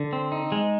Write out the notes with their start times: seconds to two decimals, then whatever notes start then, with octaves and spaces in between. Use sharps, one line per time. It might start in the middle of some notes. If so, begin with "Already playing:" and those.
Already playing: D3
0.13 C4
0.32 D#4
0.52 G#3